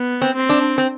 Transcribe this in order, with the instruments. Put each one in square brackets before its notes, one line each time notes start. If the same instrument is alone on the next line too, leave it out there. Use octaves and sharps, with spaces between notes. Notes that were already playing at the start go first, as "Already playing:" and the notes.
Already playing: [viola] B3
[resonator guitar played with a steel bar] C4
[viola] C4
[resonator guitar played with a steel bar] D4
C4